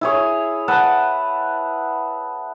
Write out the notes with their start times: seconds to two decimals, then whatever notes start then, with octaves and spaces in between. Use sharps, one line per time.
0.01 E4 G#4 C#5
0.68 B4 F#5 A5 B5